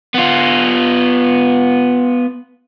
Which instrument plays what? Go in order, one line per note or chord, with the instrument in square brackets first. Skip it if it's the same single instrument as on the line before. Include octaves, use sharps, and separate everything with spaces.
[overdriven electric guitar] B3 F4